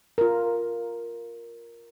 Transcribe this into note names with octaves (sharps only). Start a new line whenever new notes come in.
F4 A#4